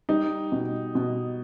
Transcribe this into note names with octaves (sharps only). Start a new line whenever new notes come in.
G3 D#4
B2
B2